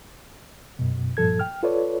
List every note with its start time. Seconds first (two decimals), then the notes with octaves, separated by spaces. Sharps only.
0.79 F#2 B2
1.17 G2 A#2 F3 A4 G#6
1.39 G5 F6
1.63 F4 A4 B4 C#5 D5